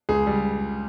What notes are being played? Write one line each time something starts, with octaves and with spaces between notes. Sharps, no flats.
C#2 G#4
G3